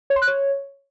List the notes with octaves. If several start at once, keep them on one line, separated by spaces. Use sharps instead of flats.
C#5
C6
F#6
C#5